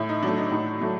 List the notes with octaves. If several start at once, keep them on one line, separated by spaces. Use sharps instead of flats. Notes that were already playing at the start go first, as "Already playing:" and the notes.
Already playing: A2 E4
D#4
F#3 A3 D4
D#4
A2 D#4
F#3 A3